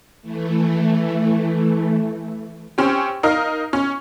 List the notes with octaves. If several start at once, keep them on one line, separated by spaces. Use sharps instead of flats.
E3 A3
C4 C#4 G4
D#4 A#4 D#5 F5
C#4